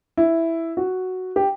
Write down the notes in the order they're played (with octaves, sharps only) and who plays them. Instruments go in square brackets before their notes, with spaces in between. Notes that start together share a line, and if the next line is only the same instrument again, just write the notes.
[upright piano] E4
F#4
G4